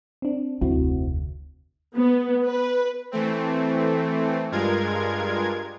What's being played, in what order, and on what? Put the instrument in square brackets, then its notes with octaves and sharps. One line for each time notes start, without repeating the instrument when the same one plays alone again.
[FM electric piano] C4 D4
[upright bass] F1 D2 [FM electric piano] C4 E4 F#4
[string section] B3
B4
[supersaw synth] E3 A3 C4
G2 G#3 F4 A#4 G#6